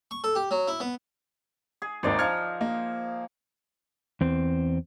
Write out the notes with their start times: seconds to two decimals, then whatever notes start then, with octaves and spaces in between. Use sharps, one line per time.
0.11 C#6
0.24 A4
0.35 G4
0.51 F#3
0.68 E4
0.80 B3
1.82 G#4
2.03 G#1 D#2 C5 D5 A#5
2.19 F3 D#5 F6 G#6 C#7
2.61 A#3
4.21 E2 C4